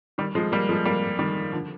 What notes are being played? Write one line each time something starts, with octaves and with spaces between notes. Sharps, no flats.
D#3 G3
F3 G#3
G3 A#3
F3 G#3
G3 A#3
D#3 G3
D3 F3